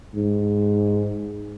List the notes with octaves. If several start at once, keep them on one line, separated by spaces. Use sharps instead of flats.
G#2